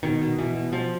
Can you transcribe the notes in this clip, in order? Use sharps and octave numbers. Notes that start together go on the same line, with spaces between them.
B2 D#3
B2
B2 E3
B2
B2 F3